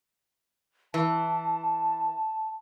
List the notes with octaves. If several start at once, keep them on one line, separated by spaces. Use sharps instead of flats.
E3 A5